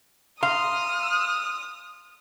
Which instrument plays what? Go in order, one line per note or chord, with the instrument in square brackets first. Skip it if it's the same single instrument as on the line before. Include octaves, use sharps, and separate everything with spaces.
[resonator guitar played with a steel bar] F5 [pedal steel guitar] A#5 C6 [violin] D#6 [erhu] F6